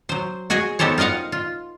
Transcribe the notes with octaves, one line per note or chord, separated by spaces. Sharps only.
F#3 C5
F#4 G#4 D#5 G#5
B3 D#4 G4 A4 C5 C#5
F4 A#4 D#5 F5 F#5
F4